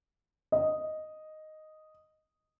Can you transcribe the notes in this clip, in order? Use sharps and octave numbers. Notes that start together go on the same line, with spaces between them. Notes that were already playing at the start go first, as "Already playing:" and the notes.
D#5